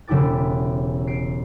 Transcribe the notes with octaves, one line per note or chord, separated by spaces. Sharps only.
E1 C#3 E4 G4 D6 A6
C7 D7